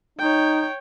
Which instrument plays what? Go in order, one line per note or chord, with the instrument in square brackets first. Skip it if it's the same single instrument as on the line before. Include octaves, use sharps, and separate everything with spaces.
[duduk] D#4 [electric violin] C#5 G5